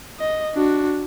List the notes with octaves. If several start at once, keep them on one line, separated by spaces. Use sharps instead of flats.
D#5
D4 F#4